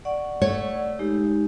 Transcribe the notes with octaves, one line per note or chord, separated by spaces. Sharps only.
D5 F#5 C#6
A3 C#5
G#3 D#4 G4